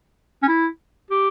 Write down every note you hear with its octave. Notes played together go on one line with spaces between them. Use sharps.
C#4
E4
G4